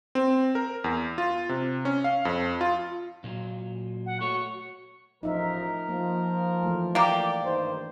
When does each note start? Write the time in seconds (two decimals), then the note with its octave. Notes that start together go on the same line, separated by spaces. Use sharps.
0.15 C4
0.55 A#4
0.84 E2
1.18 F4
1.49 C3
1.85 C#4
2.04 F5
2.25 F2
2.61 F4
3.24 A#2 F#3 F4
4.06 F#5
4.21 A3 F#4 C#5 C#6
5.23 A1 F3 D#4 A#4 E5
5.89 F3 A#3
6.63 E3 A3
6.95 A#3 G4 D5
7.44 G2 D#3 C5